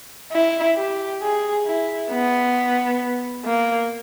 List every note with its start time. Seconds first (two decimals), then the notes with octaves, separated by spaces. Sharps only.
0.32 E4
0.76 G4
1.22 G#4
1.66 E4
2.11 B3
3.45 A#3